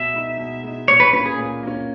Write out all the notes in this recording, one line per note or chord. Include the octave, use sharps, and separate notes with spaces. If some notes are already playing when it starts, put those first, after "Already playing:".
Already playing: B2 E5
G#3 D#4
B2
G#3 D#4
A#2 C#5
B4
A#3 C#4 B4
G#4
A#2
A#3 C#4